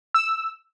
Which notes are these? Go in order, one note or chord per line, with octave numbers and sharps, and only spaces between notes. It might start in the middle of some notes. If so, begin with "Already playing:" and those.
E6